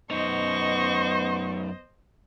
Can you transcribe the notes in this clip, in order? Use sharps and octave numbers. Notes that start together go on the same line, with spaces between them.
F#2 B3 D#4 C5 D#5 C#6